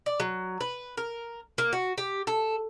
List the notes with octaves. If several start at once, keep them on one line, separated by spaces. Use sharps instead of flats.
D5
F#3
B4
A#4
A#3
F#4
G4
A4